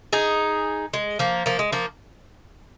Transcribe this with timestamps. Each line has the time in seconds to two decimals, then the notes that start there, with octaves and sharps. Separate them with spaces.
0.13 D#4 G#4
0.94 G#3
1.19 F3 A#3
1.46 F3 A#3
1.59 G#3
1.72 F3 A#3